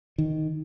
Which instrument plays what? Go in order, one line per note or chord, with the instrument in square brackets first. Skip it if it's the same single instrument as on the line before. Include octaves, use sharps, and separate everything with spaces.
[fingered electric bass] D#3